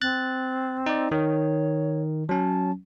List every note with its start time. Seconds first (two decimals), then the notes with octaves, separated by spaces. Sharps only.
0.01 C4 F#6 A6
0.86 D#4 D5
1.12 D#3 C#5
2.29 F#3 C#4 A5